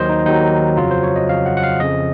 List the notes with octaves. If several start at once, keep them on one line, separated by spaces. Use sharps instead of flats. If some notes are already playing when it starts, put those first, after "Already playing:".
Already playing: D#2 D#3 F#3 C5 D#5
D#4
D#2 D#3 F#3 D#4
F2 C#3 F#3 F4
C5
C#5
D#5
F2 C#3 F#3 F5
F#5
F#5
F5
F2 C#3 F3 D#5